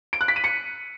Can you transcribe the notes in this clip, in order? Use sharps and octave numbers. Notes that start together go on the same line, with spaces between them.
D7
F#6
B6
D#7
C#7